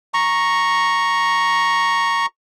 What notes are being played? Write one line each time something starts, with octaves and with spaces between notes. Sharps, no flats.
A#5 C#6